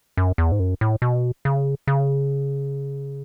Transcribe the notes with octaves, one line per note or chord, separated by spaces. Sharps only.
F#2
E2
G#2
F#2
A2
B2
C#3
C#3